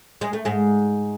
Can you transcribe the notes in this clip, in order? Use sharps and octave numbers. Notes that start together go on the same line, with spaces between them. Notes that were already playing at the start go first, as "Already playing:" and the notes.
G#3
A3
G#2 G#3